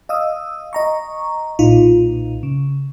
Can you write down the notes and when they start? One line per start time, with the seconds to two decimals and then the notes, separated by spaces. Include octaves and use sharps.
0.09 D#5 F5 D#6 E6
0.73 D#5 A#5 C#6
1.59 B1 A#2 D#4 F4
2.43 C#3